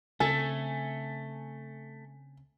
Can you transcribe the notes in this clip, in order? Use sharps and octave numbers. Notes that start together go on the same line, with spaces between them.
C#3 A3 C4 D4 A4 G#5